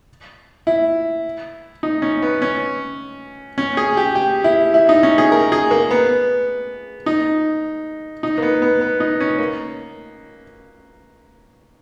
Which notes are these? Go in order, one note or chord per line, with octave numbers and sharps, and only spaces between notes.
E4
D#4
C#4
B3
C#4
C#4
G#4
G4
G4
E4
E4
D#4
C#4
G#4
A#4
G#4
A#3
B3
D#4
D#4
A#3
B3
B3
B3
D#4
C#4
A#3